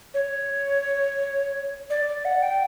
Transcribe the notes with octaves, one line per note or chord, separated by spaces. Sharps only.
C#5
D5
F#5
G5